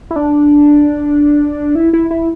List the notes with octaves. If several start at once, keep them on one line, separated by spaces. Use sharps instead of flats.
E4
D4
E4
E4
E4